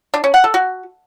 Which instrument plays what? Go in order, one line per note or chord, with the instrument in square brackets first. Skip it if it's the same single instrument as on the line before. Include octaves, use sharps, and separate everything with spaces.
[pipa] D4
C#4
F#5
A4
F#4